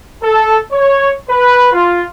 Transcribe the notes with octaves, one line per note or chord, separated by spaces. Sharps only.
A4
C#5
B4
F4